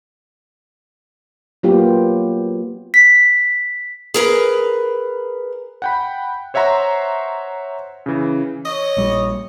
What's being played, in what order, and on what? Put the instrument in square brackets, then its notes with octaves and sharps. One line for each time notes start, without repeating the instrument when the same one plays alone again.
[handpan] F#3 A#3 B3 F4 G4
[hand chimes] B6
[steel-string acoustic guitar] G#4 A#4 B4
[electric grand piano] F#5 G5 B5
C5 C#5 E5 F#5 A#5 C6
C#3 E3
[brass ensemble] C#5 [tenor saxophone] D#5
[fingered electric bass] A#1 G3